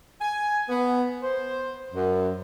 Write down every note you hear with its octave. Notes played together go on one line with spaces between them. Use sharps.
G#5
B3
C5
F#2